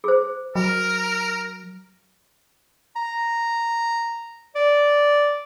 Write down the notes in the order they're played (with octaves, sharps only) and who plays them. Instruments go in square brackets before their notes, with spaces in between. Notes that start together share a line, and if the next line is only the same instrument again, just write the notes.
[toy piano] G#4 C5
[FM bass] F#3 [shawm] A#4
[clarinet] A#5
D5